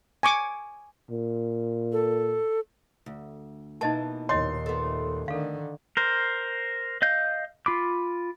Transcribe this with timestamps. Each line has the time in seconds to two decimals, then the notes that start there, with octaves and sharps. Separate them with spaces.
0.23 G#5 C#6 D6
1.10 A#2
1.93 A4
3.06 D2
3.81 B2 E3 A#3 D#4 D#5 A5
4.29 D#2 A#2 C#5 D#5 C6
4.66 A3 B3
5.28 D3 D#3 A4 F5
5.97 A#4 C5
7.02 D#5 F5 G6
7.66 F4 B5 D6